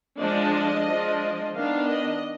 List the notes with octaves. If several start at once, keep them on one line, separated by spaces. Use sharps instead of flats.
F3 G#3 D4 D#5
F3 G#3 D4
D#3 B3 D4 F5
D#5